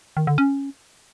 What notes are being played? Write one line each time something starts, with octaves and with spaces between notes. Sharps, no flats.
D#3
D3
C#4